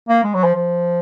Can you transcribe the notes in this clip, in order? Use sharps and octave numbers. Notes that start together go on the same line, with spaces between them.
A#3
G#3
F#3
F3
F3